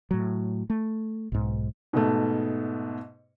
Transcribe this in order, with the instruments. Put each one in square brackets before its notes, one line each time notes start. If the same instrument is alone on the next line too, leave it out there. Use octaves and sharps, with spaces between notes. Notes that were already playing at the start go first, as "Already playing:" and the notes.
[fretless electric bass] A2 F#3
A3
B1 G#2
[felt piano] G#2 B2 A3